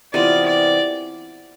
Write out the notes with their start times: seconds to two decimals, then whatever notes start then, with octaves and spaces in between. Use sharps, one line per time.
0.14 C3 E3 B3 F4 D5
0.46 D5